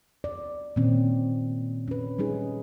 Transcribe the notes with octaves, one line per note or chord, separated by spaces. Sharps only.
D5
A#2 D#3 C4 C#4
C#4 B4
G3 C#4 D#4 G#4